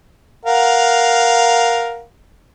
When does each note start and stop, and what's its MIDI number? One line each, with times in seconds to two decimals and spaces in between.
0.45 2.02 70
0.45 2.02 77
0.45 2.02 78